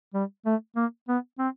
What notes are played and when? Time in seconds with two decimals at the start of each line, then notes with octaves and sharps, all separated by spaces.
0.14 G3
0.46 A3
0.76 A#3
1.08 B3
1.39 C4